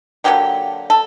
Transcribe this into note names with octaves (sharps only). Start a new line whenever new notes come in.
D3 F#3 A#3 G4
A4